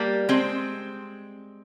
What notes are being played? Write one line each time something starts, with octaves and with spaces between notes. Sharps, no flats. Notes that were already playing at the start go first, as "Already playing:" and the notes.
Already playing: G3 A#3
G#3 C4